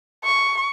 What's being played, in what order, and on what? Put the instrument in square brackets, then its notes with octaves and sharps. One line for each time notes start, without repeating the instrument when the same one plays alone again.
[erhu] C#6